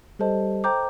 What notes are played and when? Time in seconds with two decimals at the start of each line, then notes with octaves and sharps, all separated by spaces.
0.19 G3 A4 C5 D#5 A5
0.64 C5 G5 A#5 D6 G6